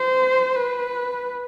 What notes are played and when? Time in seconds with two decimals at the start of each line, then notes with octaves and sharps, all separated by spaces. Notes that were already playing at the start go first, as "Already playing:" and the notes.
Already playing: C5
0.56 B4